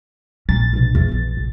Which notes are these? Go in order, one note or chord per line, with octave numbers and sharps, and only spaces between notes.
A#1 F#3 C#4 A6
G2 B2
E2
E3 F3
C#3